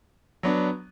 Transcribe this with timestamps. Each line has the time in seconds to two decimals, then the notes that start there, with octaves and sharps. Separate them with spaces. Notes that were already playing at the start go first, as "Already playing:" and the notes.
0.43 F#3 B3 D4